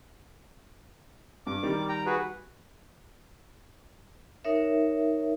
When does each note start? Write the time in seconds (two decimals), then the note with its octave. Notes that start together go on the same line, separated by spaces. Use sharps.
1.46 G2 D6
1.63 D#3 G3 A#4
1.89 G5 A#5
2.06 F#4 G#4 B4
4.44 D#4 A#4 C#5 E5